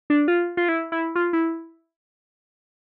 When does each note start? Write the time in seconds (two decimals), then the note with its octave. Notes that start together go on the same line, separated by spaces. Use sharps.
0.10 D4
0.28 F4
0.57 F4
0.69 E4
0.92 E4
1.15 F4
1.33 E4